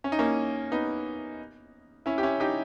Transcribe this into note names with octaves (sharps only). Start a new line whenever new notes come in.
C#4
D#4
A#3 C#4
B3 D#4
C#4 E4
G4
C#4 E4
D#4 G4